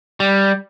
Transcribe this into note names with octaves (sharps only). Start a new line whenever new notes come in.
G3